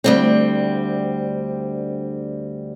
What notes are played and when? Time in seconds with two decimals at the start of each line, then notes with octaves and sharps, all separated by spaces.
0.04 D2 G3 C4